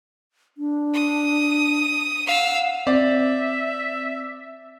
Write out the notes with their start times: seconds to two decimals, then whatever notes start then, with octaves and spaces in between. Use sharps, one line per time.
0.58 D4
0.94 D#6
2.27 F5 F#5 E6
2.87 C4 D5 E5